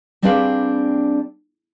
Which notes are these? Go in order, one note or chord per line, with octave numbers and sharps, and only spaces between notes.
G3 C4 D4 G#4 B4 F5